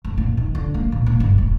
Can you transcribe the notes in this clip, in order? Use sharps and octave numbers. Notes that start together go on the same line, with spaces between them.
F1
A#2
D#3
D3
A#3
A#2
A#3
G1
D#1